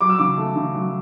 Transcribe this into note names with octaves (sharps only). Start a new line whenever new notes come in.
F#3 D6
E6
C#3 D6
A3
C#3
F#3